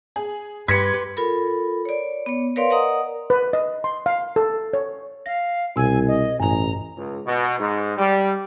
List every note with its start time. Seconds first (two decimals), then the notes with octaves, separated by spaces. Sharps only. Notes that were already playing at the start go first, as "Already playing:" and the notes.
0.16 G#4
0.68 G2 G4 B4 C6 G#6 A#6 B6 C#7
1.17 F4 A4 A#4 B5
1.85 C#5 D5
2.26 B3 C#5
2.56 A#4 B4 C#5 D5 F5 C6
2.70 A#4 D5 D#5 F#5 A#5 D#6
3.30 B4
3.53 D#5
3.84 C6
4.06 F5
4.36 A4
4.73 C#5
5.26 F5 A#6
5.76 C2 B2 G#5 E6
6.07 D#5
6.40 A1 G2 G#5 A#5
6.97 C#2
7.26 B2
7.59 G#2
7.97 G3